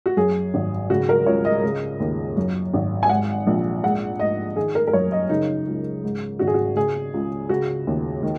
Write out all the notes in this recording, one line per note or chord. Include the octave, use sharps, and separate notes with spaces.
F#4
F#2 G#4
G#1
C#3 F#4
A#4
C#2 C#5
D#5
C#3
D#2
F#2
G#1
G#5
G#2 F#5
A#1
G#3 F#5
G#2 D#5
D#3 G#4
A#4
A#4
F#2 C#5
D#5
C#3 D#4
C#2
G#2
G#1 F#4
G#4
F#4
C#3 G#4
C#2
C#3 F#4
D#2
D#3